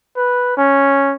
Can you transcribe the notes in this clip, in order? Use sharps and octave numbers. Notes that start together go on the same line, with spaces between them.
B4
C#4